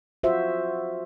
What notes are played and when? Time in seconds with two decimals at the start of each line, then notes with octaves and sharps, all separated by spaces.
0.23 F4 F#4 C5 E5